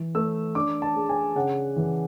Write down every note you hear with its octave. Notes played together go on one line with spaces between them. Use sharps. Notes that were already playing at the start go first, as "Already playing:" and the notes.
Already playing: E3
A3 E6
D4 D6
A5
G#3
G#5
C#3 F#5
E3